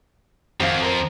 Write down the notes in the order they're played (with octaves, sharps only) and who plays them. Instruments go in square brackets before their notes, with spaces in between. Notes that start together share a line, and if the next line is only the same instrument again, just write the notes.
[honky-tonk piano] G#1 F5 [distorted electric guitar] F2
[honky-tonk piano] A#4 C5